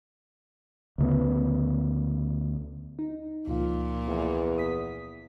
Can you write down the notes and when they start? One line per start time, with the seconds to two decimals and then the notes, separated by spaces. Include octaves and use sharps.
0.98 D2 C#3 B3
2.99 D#4
3.48 C#2 A#2 F3 F5
4.08 E2
4.58 D#6 B6